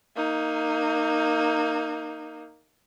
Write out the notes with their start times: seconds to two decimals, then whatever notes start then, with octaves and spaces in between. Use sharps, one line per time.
0.16 A#3 D#4